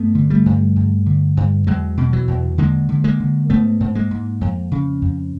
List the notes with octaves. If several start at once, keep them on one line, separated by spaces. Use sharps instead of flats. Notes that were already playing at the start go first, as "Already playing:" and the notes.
Already playing: G2 A3 B3
D3
G3 A3
G2
G2
D3
G2
E2 F#3 G#3
B2
E3 F#3
E2
D3 G#3 A#3
D3
G#3 A#3
D3
G#2 A3 B3
G#2
G#3 A#3
G#2
F2
C#3
F2